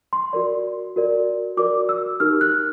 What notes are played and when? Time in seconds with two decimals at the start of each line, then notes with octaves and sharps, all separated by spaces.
0.13 C6
0.33 F#4 A#4 D5 C6
0.96 F#4 A#4 D5
1.57 F#4 A#4 D5 D6
1.89 E6
2.20 D#4 G4 A#4 F6
2.41 F#6